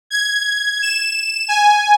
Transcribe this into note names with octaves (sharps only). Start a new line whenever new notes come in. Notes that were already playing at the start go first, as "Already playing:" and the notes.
G#6
E7
G#5